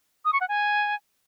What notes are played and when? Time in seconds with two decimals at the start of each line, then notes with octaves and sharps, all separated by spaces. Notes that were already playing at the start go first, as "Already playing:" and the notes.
0.25 D#6
0.33 C#6
0.41 F#5
0.49 G#5